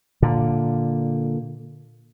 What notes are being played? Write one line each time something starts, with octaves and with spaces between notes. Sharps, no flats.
A#2 D3